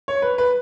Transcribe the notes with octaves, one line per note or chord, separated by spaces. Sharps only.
C#5
B4
B4